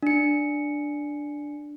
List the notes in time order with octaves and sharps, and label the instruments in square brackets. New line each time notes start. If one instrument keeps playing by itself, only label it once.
[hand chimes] D4 C#7